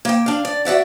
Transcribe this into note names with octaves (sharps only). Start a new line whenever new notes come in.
A#3 G5
D4 F5
D5
F#4 D5 E5 F#5